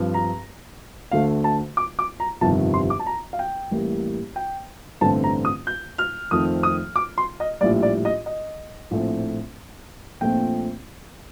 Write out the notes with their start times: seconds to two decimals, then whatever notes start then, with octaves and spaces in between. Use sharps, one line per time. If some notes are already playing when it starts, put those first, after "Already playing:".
Already playing: G2 F3 C4
0.14 A#5
1.11 D2 D3 A3 F5
1.44 A5
1.77 D6
1.99 D6
2.20 A#5
2.41 G1 F2 C3 D#3 G3 A5
2.74 C6
2.90 D6
2.99 A5
3.07 A#5
3.33 F5
3.39 G5
3.71 A1 A2 G3 A#3
4.36 G5
5.01 A1 G2 D3 A3 C4 A5
5.24 A#5
5.45 D#6
5.67 G6
5.98 F6
6.31 F2 D#3 A3 C4 D#6
6.63 D#6
6.96 D6
7.18 C6
7.40 D#5
7.61 A#1 A2 G3 D5
7.83 D5
8.05 D#5
8.26 D#5
8.91 A#1 A2 A3 C4
10.21 A#1 A#2 A3 C4 G5